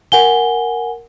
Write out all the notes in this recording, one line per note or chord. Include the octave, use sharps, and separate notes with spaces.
A#4 F#5 G#5 G7